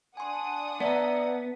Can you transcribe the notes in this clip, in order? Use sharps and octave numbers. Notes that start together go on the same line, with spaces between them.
D4 F#5 G#5 C6 D#6
B3 D5 E5 A#5